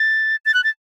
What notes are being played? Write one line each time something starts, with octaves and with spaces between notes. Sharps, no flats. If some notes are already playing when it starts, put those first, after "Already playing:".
Already playing: A6
A6
F#6
A6